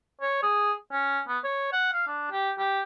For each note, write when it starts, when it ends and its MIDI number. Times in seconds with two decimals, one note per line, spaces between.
0.21 0.39 73
0.43 0.73 68
0.92 1.21 61
1.28 1.39 59
1.44 1.70 73
1.73 1.91 78
1.93 2.05 77
2.08 2.31 62
2.32 2.51 67
2.58 2.82 67